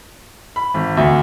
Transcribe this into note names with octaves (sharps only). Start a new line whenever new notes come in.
B5
G#1
D2